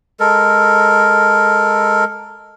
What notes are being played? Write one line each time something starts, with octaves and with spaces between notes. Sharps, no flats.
G#3 A4 A#4